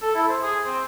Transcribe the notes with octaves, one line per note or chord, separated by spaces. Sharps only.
A4
E4
C5
G#4
C4